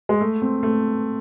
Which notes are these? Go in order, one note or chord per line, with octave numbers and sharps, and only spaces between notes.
G#3
A3
C4
A3